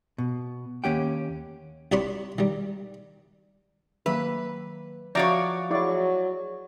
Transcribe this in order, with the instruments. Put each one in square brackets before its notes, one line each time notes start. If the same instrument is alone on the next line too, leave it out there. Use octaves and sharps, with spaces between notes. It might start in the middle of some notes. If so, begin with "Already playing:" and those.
[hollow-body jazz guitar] B2
D#2 A#3 C#4 G4 F#5 G5
[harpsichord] C2 D4 G4 C#5 B5 C6
D#3 G3
[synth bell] D#3 F#3 A#3 [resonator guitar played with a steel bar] B4 [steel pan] E5
[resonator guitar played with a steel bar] F3 F#4 C#5 [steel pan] D5 A#5 D6 [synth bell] E5 F5
[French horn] F#3 [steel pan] E4 D5 [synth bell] G#4 C#6